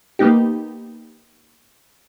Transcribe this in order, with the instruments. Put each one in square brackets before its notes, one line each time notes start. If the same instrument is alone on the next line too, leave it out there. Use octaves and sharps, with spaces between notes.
[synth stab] A#3 B3 D#4 G4